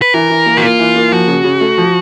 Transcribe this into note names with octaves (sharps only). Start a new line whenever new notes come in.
B4
E3 A#4
E3
A#3
F#4
A#3 F4
E3
A#3
F3 F#4
C#3
C#3
A3
F3